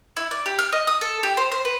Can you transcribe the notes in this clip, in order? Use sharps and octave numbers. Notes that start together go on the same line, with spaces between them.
E4
D5
G4
F6
D#5
D#6
A4
G4
C5
C5
B4